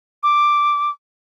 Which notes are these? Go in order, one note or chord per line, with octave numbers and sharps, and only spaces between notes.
D6